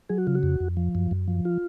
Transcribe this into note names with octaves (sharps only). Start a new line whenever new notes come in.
F#3 G#4
F#4
C#3 F4
F#4
F2
F2
F3
F#2
F#2
F3
F4